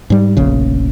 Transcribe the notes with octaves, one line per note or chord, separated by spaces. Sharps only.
G#2 G3
F1 A#1 C#3